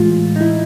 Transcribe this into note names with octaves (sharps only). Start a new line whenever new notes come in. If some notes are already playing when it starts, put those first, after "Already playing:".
Already playing: A2 E3 G#3 F4
D#4
E4